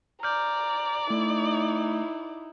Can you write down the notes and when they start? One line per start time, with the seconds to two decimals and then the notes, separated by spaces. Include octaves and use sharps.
0.23 D5 A#5 F6 G6
1.10 A3 D#4 E4